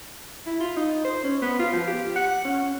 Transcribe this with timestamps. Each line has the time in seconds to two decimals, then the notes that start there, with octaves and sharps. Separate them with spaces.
0.46 E4
0.60 F4
0.77 D#4
1.04 C5
1.23 C#4
1.42 B3
1.59 F4
1.73 F3
1.87 G4
2.16 F#5
2.44 C#4